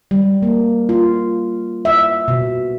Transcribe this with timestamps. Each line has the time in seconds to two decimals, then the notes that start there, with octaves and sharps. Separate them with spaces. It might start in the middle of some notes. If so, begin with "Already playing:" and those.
0.11 G3
0.42 A#3
0.89 F4
1.85 E5
2.28 B2